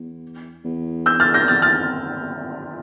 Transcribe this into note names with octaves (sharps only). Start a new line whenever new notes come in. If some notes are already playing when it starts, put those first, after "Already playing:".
Already playing: E2
E2
E6 G6
F6 A6
G6 A#6
E2 F6 A6
F6 A6